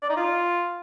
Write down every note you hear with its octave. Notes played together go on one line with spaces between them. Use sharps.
D5
D#4
F4